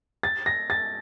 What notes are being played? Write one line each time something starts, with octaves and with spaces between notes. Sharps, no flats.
A6
A#6
A6